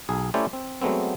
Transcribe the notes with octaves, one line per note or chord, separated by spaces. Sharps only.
B1 G#4
A3 C#4 E4 G4 C5 D5
C4
F#3 G#3 A3 B3 C4